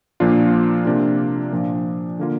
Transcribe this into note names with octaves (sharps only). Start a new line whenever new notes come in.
A#2 F3 A#3 D4 F4
C3 A#3 D4 F4
A#2 F3 D4
D3 A#3 F4